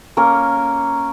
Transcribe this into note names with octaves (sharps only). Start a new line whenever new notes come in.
A#3 C#4 A#4